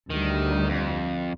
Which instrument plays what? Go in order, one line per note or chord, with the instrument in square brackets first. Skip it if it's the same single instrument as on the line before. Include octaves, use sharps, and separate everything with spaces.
[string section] D2 G3 [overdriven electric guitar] D#3
[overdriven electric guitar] F2